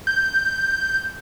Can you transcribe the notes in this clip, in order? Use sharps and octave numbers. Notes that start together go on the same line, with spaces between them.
G6